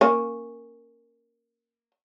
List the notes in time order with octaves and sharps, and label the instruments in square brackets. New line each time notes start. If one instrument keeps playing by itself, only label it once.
[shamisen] A#3 C#4